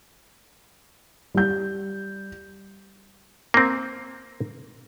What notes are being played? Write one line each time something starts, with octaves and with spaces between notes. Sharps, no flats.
G3 G6
A#3 C4